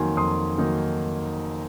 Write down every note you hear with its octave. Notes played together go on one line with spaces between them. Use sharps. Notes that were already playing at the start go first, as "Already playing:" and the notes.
Already playing: F2 D#3 F#3 A#3 D#4 G#5 C6
F2 C6 D#6
D#3 F#3 A#3 D#4